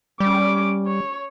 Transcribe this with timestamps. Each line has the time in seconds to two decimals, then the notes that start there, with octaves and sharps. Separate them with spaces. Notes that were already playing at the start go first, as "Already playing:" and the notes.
0.20 G3 C#4 D6
0.87 C#5